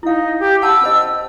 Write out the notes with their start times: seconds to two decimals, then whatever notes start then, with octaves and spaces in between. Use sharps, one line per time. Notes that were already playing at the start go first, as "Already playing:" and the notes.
0.03 D#4 E4 F5
0.40 G4
0.62 F#5 A5 B5 E6
0.82 C#4 C5 D#5